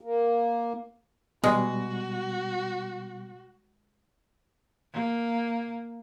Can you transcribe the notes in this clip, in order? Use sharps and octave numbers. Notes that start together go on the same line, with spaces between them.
A#3
B2 G3 G#3 F#4
A#3